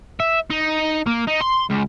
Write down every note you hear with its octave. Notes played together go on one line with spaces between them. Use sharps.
E5
D#4
A#3
D#4
C6
C#2